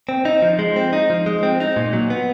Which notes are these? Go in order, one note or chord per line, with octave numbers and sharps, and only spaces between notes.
C4
D#4
F3
G#3
C4
D#4
F3
G#3
C4
D#4
A#2
F#3
B3